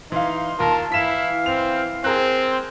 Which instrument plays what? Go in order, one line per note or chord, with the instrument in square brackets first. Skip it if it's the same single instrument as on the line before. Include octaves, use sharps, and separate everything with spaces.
[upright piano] E3 F5 [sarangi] D#4 [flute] C6
[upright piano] D#2 F4 [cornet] A#4 [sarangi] A5
[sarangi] E3 [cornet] E4 [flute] F5 [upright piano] B6 E7
[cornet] C4 [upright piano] F7
[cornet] C4 [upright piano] G#4 A#4 F#6